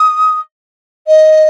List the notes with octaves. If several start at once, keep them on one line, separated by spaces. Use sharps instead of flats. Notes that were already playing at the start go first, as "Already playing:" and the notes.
Already playing: D#6
D#5